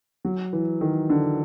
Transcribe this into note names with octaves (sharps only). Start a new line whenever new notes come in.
F#3
E3
D#3
D3